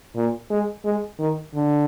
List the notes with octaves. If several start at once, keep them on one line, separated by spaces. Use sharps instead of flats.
A#2
G#3
G#3
D#3
D3